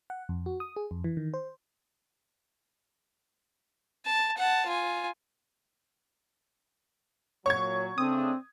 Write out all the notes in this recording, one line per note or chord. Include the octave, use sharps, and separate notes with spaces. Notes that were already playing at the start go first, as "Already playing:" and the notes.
F#5
F2
F#4
D#6
G#4
F2
E3
D#3
C5
A5
F#5 A5
F4 G#5
A#2 F#3 C#5 C#6 G#6
C#3 A3 C4 D4 D#6